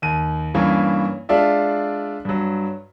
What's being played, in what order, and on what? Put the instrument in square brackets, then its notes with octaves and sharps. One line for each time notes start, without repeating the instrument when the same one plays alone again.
[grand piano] D#2 D#7
G2 E3 A#3 C#4
G#3 D4 F4 D5 E5
G2 F#3